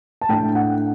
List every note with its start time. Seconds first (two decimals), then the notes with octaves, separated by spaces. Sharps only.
0.21 A5
0.29 A2 A3 D4 G5
0.55 F#5